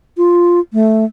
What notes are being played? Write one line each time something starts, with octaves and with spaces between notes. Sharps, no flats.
F4
A3